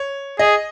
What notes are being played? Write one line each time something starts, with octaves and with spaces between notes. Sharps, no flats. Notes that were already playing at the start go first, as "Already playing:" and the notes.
Already playing: C#5
G#4 D#5